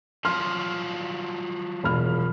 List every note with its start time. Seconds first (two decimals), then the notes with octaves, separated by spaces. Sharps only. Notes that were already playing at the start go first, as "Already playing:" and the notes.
0.25 F3 F#3 C6 F6
1.83 E1 B5 F6